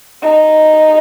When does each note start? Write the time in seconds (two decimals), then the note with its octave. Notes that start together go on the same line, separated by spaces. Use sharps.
0.22 D#4